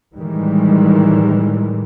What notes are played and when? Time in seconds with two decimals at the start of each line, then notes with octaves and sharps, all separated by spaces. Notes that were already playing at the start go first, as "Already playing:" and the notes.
0.16 A2 D#3 E3 G3 G#3